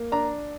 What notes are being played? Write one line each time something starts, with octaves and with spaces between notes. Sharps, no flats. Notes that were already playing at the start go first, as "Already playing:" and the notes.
Already playing: A#3
D4 A#5